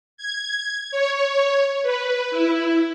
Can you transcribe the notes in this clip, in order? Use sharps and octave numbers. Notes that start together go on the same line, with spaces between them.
G#6
C#5
B4
E4